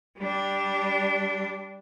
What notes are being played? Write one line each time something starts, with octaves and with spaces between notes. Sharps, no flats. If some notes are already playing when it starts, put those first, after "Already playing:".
G3 D4